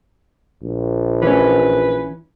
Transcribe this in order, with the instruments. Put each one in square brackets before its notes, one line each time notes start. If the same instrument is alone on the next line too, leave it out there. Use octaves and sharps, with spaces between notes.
[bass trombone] A#1
[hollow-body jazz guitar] E3 C#4 [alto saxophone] B4